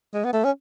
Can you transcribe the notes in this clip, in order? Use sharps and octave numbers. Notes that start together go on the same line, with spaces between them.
G#3
B3
A3
C#4